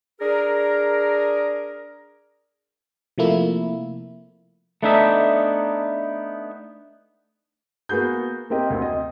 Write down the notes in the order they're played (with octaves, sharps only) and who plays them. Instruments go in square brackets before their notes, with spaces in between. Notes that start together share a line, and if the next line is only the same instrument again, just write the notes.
[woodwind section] D4 G#4 A#4
[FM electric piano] C3 F3 A3 A#3 E4
[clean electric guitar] A3 B3 D4 D#4 E5
[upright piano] A#3 B3 F#4 G#4 G6
A#3 C4 G4 D#5
D2 C4
D#5